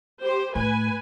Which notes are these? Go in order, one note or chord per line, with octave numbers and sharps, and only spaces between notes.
G4 C5
A2 B4 G#5